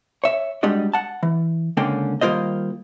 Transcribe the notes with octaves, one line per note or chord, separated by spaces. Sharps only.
C#5 E5
G3 G#3 D4 F#4 D#5
F#5 A5
E3
C#2 D3 A#3 C#4 D4 G5
D#3 G3 A#3 F4 C5 D#5